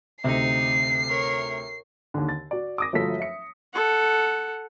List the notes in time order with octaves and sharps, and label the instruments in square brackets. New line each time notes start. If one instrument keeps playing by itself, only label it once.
[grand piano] D2 C3 [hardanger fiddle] D#4 [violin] C7
[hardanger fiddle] A#4 C#5
[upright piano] D#2 D3
A6
F#4 D5
D6 D#6 A#6
G1 F3 F#3 A3 A4 B6
E5 C#7
[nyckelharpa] A4 F#5